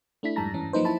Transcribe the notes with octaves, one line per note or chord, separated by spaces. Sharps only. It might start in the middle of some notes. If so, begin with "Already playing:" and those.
A3 D4 E4 B6
F2 G#2 G3 A5 A#5 A#6
G2 E3 C#4
F3 F#3 A#3 D#4 B4 C5
E4 C5 A5 B5